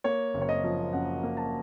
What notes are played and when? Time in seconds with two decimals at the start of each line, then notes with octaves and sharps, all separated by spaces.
0.04 A#3 C#5
0.34 F#1
0.41 C#5
0.49 D#5
0.64 F3
0.93 F#2 F#5
1.23 A#3
1.37 A5